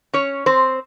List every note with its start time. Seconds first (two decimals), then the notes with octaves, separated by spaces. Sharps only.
0.13 C#4 C#5
0.46 C4 C5